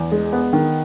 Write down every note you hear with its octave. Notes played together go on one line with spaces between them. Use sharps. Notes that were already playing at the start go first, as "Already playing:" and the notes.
Already playing: E2
G#3
B3
D#3